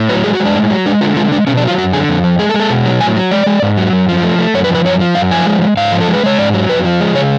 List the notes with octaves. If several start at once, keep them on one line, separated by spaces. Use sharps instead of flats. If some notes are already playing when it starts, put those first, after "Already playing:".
Already playing: A2
F#3 B4
G#3 G#4
F#4
G#3
D4
A2
F#3
G#3 D4
D3 F4
G#3 F4
G#3 D4
B2 C#4
D4
F#3 F4
F#2 F#4
D3 G#4
F2
F3
G#3 G#4
A4
G#3
A4
B2
F#3
A2 G#5
F#3
G#3 D5
G#3
G#2
F#3
F#2
F3
A3
A3
F#2 C#5
B4
F3
B4
F#2 C#5
F3
F#2 F5
F3 G#5
G#3
G#3
G#2 F5
F3
A4
G#3
B4
G#3 C#5
G#2 D5
F#3
F2 B4
F3
G#3
C#3 C#5